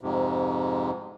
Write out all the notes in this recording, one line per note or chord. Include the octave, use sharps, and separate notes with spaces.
F2 G#2 C3